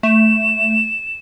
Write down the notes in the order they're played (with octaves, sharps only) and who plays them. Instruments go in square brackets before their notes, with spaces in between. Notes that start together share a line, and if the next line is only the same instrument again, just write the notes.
[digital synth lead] A3 [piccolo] E7